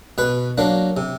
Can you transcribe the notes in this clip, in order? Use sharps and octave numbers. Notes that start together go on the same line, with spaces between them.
B2 B4
F#3 A#3 D4
C3